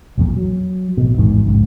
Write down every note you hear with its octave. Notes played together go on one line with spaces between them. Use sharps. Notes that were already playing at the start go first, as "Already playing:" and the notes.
A#1 E2 A#2
F#3
A1 B2
A1 E2 G#2 D#3
A#1 E2 G#2 C#3